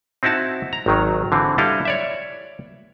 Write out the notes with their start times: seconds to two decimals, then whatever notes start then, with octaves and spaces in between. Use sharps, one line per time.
0.23 C4 D#4 E4 F#4 A5
0.73 A#5
0.86 G#1 D#3 F#3
1.32 D3 E3 C4
1.58 G3 D4 E4 A4 D#5 F5
1.85 C#5 D5 E5